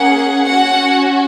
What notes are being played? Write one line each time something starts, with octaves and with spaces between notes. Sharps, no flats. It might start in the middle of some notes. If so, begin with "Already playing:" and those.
Already playing: A#3 C#4 G#4 F#5
C#4 F#4 F#5